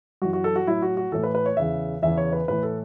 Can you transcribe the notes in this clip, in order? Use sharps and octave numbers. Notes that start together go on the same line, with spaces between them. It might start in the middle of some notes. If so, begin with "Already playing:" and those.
F#2 E3 F#4
F#4
A4
F#4
A2 F#3 E4
F#4
F#4
A2 E3 A4
B4
B4
C#5
E2 C#3 E3 E5
E2 C#3 E3 E5
C#5
B4
A2 E3 B4
A4